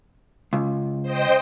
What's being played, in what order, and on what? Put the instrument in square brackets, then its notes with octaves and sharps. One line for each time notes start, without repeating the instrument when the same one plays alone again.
[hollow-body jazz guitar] C#2
[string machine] C5 D#5 G5